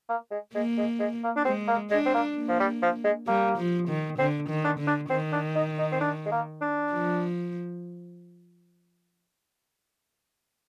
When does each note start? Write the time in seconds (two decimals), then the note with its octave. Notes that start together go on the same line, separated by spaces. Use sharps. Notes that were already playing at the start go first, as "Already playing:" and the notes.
0.09 A#3
0.31 G#3
0.54 G#3 A#3
0.78 G#3
1.00 G#3
1.23 A#3
1.36 D4
1.45 G#3 C4
1.68 A#3
1.90 G#3 D4
2.06 C4
2.14 A#3
2.37 A#3
2.48 F3
2.60 G3
2.82 F3
3.04 G#3
3.27 G3 A#3
3.58 F3
3.89 D#3
4.19 D3 C4
4.49 D#3
4.64 D4
4.79 D3
4.87 D4
5.10 D#3 C4
5.32 D4
5.55 D#4
5.78 D#4
5.92 C4
6.01 D4
6.25 G#3
6.31 A#3
6.61 D4
6.92 F3